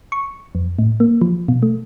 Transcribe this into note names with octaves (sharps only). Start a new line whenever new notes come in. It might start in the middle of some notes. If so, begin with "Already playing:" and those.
C#6
F2
A2
A#3
F3
B2
A3